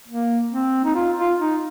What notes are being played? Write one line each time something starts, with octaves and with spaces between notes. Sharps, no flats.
A#3
C4
D#4
F4
F4
D#4